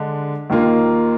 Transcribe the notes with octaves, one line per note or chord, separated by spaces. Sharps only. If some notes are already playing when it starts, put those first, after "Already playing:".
Already playing: D3 G#3 D4
D#2 D#3 A#3 F4